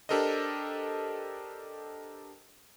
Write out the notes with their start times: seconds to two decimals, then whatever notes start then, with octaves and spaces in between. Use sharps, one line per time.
0.09 D4 G4 A4 A#4 C5 D#5